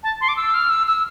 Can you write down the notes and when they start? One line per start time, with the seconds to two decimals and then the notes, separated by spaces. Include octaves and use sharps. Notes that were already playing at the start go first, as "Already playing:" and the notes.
0.03 A5
0.21 C6
0.28 D6
0.37 E6
0.54 F6
0.70 E6
0.87 E6